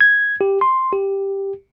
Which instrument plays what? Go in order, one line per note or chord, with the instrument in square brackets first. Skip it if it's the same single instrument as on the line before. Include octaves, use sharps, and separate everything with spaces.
[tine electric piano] G#6
G4
C6
G4